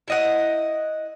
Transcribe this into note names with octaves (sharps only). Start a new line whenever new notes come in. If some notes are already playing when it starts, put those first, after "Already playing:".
E4 D#5 F#5